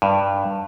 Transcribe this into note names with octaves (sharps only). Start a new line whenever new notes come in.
G2